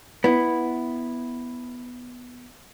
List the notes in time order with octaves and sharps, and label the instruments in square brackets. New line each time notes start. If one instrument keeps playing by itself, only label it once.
[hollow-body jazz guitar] B3 E4